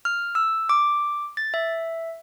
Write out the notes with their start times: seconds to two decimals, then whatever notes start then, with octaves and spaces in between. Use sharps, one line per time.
0.05 F6
0.35 E6
0.69 D6
1.37 A6
1.54 E5